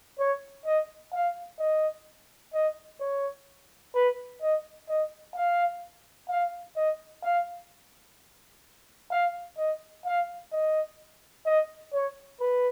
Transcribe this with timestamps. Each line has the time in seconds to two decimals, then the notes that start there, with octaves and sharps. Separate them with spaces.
0.19 C#5
0.66 D#5
1.13 F5
1.59 D#5
2.54 D#5
3.01 C#5
3.95 B4
4.42 D#5
4.89 D#5
5.35 F5
6.30 F5
6.77 D#5
7.24 F5
9.11 F5
9.58 D#5
10.06 F5
10.52 D#5
11.46 D#5
11.93 C#5
12.40 B4